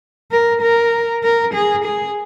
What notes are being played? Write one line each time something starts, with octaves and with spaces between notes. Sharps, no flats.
A#4
A#4
A#4
G#4
G#4